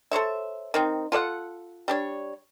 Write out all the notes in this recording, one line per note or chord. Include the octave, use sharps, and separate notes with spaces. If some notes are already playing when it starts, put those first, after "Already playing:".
A4 C5 C#5 E5
D#3 C4 D#4
F4 A4 D5 F#5
G3 D4 C#5